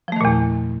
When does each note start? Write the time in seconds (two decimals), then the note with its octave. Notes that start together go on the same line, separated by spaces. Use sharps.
0.08 F3
0.12 A3
0.16 D#3
0.21 A#2
0.25 E2